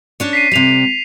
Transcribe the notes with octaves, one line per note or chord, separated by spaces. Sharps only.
C#4 D4 C#5
B6 C7 D#7
C3 G3 D#7 F7